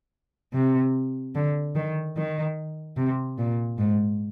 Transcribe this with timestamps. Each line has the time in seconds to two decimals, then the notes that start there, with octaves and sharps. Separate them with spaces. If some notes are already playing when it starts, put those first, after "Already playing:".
0.54 C3
1.35 D3
1.75 D#3
2.17 D#3
2.97 C3
3.38 A#2
3.79 G#2